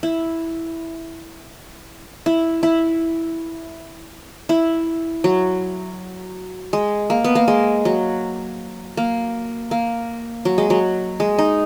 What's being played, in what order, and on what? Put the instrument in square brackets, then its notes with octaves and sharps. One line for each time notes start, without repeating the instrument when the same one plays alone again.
[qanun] E4
E4
E4
E4
F#3
G#3
A#3
B3
A#3
G#3
F#3
A#3
A#3
F#3
G#3
F#3
G#3
D#4